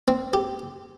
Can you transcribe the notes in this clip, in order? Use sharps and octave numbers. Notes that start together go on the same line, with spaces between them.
C4
G4